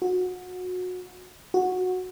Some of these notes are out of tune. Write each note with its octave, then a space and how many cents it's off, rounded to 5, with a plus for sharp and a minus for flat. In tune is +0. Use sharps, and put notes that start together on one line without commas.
F#4 -25
F#4 -10